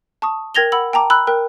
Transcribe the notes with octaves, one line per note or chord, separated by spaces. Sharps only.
A5 C#6 D#6
A#4 G5 G#6 A#6 F7 G7
F#5 B5 E6 F#7
G5 A5 A#5 D6
B5 E6 F#6
A#4 G5 F#6